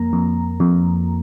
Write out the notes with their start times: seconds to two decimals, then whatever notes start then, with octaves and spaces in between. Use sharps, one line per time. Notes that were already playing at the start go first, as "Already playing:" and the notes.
Already playing: F2 A#3 A#5
0.13 F2
0.60 F2